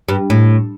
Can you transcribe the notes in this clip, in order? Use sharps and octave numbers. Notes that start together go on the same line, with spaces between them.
G2
A2